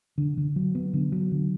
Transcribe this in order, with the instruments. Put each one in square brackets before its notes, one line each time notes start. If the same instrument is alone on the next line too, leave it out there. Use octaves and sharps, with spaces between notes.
[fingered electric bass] D3
D3
F#3
B3
D3
F#3
D3